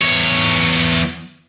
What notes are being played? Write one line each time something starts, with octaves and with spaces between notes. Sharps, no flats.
E2 C#5